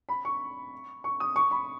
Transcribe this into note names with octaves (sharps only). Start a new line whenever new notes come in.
B5
C#6
C#6
D#6
C#6
B5